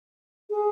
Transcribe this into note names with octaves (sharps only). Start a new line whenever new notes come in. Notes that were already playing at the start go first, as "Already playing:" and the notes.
G#4